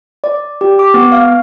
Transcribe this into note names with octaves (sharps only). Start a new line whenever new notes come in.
D5
G4
D6
B3
F5